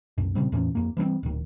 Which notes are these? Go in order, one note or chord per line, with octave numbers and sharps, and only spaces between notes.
C2 F#2
A#2 C#3 G3 C4
E2 A2 E3 C#4
F2 A#3
E3 G3 A#3 C4
D1 D#3